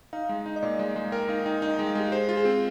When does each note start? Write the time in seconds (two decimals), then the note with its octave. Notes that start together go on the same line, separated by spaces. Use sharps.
0.13 D#4 F5
0.29 G#3
0.46 D#4
0.56 D#5
0.63 A#2 D5
0.79 G#3
0.96 G#3
1.12 A#4 G5
1.28 D#4 F5
1.46 D#4 G5
1.62 D#4 G5
1.75 G#3 G5
1.87 F5
1.95 G#3 G4
2.12 G#4 C5
2.29 F4
2.37 G#4
2.45 C4